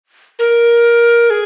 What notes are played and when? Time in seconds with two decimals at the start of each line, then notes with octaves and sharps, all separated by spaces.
0.39 A#4
1.30 G#4